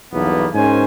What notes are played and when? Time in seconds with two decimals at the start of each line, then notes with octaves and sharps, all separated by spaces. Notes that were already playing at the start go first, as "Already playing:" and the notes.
0.12 B1 E2 G2 A#3 B3
0.54 G#2 C#4 A#4 C5 G#5